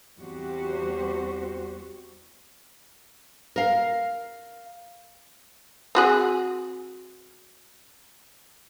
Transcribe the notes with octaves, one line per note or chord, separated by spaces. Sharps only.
E2 G3 C4 F#4 G4 C5
A#4 F5
C4 F#4 G#4